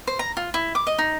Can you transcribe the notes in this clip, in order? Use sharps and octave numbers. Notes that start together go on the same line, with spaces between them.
C5
A#5
F4
E4
D6
D#5
D#4